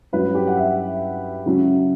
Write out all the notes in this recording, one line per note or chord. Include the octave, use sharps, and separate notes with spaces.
G2 F#3 C#4 B4
G4
F#5
E5
C#3 F#3 C#4